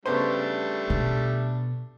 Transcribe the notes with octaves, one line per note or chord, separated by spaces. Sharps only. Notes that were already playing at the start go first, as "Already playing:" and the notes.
C#3 G3 A3 B3 D4 C5
B2